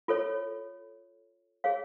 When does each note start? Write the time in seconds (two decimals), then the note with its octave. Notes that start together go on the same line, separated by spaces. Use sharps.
0.08 F4 A4 C#5
1.64 G#4 C#5 F5